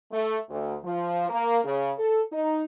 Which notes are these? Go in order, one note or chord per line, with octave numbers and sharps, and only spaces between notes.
A3
D2
F3
A#3
C#3
A4
D#4